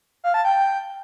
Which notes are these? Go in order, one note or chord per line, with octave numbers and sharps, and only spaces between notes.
F5
A5
G5